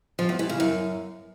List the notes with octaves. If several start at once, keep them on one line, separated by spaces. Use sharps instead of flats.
F3
E2
E3
C#3
F#2